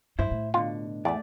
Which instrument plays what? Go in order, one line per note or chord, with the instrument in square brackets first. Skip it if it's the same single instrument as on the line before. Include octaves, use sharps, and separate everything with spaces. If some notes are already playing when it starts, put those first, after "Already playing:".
[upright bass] G2 [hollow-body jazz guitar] E4 C5
[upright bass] A2
[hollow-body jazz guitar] B2 D3 [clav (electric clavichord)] F4
[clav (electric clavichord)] E2 [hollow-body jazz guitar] A3 D5